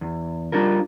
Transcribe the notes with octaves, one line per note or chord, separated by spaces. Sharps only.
E2
G3 D4 F4 A#4